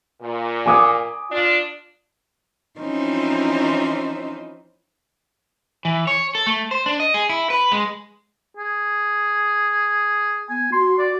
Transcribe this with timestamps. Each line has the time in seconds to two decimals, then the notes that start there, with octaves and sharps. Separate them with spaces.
0.21 A#2
0.66 G#5 D6 D#6
1.31 D4 F4
2.79 E3 F3 C4 C#4 D#4 C5
5.85 E3
6.07 C#5
6.35 A4
6.46 A3
6.71 C5
6.86 D4
7.00 D#5
7.14 G#4
7.29 E4
7.50 B4
7.72 G#3
8.57 G#4
10.50 B3 G#5
10.72 F#4 C6
10.99 D5